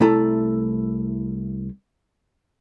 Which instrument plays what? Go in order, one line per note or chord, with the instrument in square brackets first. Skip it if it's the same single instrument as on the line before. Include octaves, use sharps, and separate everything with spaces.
[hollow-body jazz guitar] C2 A3 E4 A4 A#5